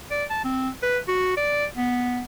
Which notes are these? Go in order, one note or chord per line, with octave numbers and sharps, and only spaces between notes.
D5
A5
C4
B4
F#4
D5
B3